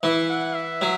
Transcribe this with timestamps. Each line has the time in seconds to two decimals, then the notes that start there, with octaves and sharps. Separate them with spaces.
0.03 E3 E5
0.29 F#5
0.55 E5
0.82 F#3